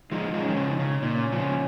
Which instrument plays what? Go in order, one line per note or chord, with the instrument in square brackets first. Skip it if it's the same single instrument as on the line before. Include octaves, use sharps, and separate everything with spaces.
[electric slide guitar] F3 G#3 [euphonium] D#4
[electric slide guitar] F3 G#3
[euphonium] C#4
[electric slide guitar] D#3
C#3 F3
[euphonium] D#4
[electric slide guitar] C#3
[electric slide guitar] A#2 [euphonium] C#4
[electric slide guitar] C#3 F3